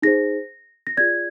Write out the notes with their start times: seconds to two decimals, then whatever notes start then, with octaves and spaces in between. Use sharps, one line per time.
0.02 D#4 G#4 C5 A#6
0.87 A#6
0.97 F4 G#4 D5 G#6